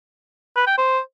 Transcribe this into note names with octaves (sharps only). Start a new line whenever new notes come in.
B4
G5
C5